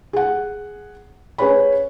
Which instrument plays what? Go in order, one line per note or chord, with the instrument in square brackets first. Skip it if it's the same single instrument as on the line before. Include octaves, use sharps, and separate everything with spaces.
[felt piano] G#4 F#5
C#4 G#4 B4 C#5 B5